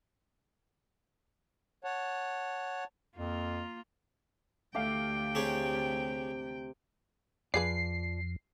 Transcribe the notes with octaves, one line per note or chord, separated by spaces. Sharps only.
C#5 F#5 A5
F2 A#3 F4
D2 A3 G4 E5 F5 G5
C3 G4 G#4 C#5
F2 F3 F4 G#4 B4 D5 C7